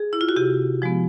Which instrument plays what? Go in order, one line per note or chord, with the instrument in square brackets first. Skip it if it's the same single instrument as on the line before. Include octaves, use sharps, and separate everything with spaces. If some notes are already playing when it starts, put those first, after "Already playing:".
Already playing: [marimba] G#4
E4
F4
F#4
C3 G4
F3 G#3 B3